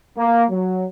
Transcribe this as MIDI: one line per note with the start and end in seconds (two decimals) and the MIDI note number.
0.17 0.44 58
0.50 0.85 54